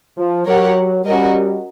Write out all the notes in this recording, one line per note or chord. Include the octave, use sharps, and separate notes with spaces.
F3
F#3 G4 A#4 C#5 F#5
G3 C#4 F#4 A#4 D#5